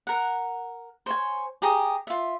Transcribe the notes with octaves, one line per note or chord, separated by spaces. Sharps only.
A#4 F#5
C5 C#5 G#5
G4 G#4 A#5 D#6
F4 E5